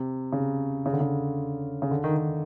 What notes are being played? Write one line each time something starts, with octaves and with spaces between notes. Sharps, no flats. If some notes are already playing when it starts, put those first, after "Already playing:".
Already playing: C3
C#3
C#3
D3
C#3
C#3
D3
D#3
D#3